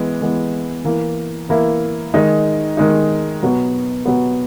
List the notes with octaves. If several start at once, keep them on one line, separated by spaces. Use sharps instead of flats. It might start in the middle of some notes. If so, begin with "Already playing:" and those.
Already playing: E3 G#3 B3
E3 G#3 B3
E3 A#3 E4
E3 A#3 E4
D#3 G#3 D#4
D#3 G#3 D#4
B2 F#3 B3
B2 F#3 B3